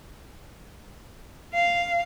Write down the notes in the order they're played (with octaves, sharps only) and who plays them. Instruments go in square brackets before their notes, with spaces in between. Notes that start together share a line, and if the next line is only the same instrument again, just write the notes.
[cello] F5